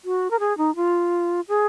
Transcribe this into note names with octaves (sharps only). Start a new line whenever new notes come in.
F#4
A#4
G#4
D#4
F4
G#4